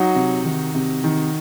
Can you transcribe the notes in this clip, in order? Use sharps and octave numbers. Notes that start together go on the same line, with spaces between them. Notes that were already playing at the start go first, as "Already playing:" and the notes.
Already playing: F#3 D#4 F#4
C3
D#3
C3
D#3